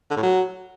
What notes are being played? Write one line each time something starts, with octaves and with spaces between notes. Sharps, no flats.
D3
A2
F#3